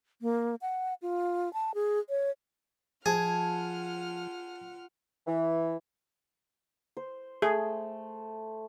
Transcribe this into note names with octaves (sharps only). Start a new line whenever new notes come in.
A#3
F#5
F4
A5
G#4
C#5
F3 F4 G#4 F#5 A5 F6 G#6 A6
E3
C5
A3 G#4